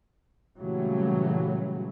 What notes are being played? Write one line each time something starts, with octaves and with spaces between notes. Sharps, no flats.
A#2 C#3 E3 F#3 G3 A3